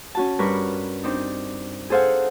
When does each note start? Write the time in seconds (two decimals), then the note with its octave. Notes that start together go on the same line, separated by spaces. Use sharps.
0.15 C#4 F#4 A5
0.39 G2 A#4 B4 C#6
1.04 C4 D4 D#4
1.90 G#4 A4 C5 F5 F#5 G#5